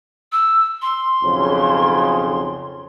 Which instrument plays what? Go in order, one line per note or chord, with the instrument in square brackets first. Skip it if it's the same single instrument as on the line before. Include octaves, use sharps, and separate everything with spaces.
[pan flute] E6
C6
[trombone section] B1 F2 C#3